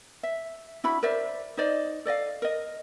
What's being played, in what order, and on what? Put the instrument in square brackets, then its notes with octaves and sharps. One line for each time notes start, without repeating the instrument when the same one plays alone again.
[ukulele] E5
D4 E4 F#4 B5
A#4 C5 D5 E5
D#4 C5 D5 D#5
A4 D5 D#5 F5
A#4 D#5